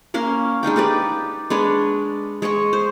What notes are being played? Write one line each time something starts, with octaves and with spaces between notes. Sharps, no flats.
A#3 C#4 A#4 F5
G#3 D4 D#4 G5
D#4 G4 B4 D5
G#3 D4 B4 C#5
G#3 C#5 D#5 C#6
C5